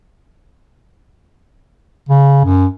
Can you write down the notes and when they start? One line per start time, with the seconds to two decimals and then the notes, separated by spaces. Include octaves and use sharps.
2.09 C#3
2.45 F#2